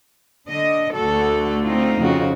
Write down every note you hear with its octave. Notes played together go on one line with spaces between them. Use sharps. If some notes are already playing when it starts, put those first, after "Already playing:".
D3 D4 D#5
D2 D3 A3 F#4 A4
C4 D#4 F4
F2 C#3 F#4